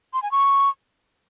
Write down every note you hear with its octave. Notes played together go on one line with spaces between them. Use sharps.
C6
G#5
C#6